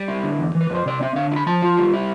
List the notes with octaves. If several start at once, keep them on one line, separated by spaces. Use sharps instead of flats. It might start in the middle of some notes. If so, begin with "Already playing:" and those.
Already playing: G3 D5
E4
D3
E2
E3
B4
F2 C5
C3 D5
C4 E5
D3 F5
E4
B5
F3 A5
F4
G3
E4